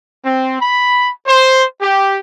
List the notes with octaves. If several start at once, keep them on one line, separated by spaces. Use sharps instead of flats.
C4
B5
C5
G4